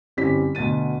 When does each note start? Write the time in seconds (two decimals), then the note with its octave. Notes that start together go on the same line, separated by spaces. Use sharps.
0.17 G1 C4 C#4 E4 G4 B6
0.55 D2 B2 A6 D#7